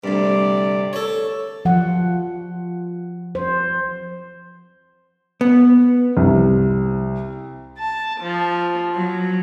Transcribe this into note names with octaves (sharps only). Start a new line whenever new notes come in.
D2 G2 C3 D5
A4 C#5
F3 F#5
C5
B3
C2
A5
F3
F#3